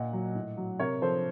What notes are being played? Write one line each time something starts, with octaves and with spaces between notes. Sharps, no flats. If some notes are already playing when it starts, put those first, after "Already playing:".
Already playing: A#2 D#5 F#5
F#3
A2
F#3
C3 A#4 C#5
F3 A4 C5